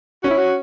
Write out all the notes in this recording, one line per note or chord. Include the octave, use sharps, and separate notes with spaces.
C#4 F#4
E4
F#4